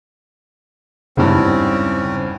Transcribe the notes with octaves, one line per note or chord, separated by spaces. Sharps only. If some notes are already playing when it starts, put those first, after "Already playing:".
G#1 E2 G2 C#3 C4 C#4